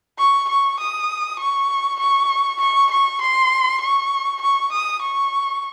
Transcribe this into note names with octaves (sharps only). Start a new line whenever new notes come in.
C#6
C#6
D#6
C#6
C#6
C#6
C#6
C6
C#6
C#6
D#6
C#6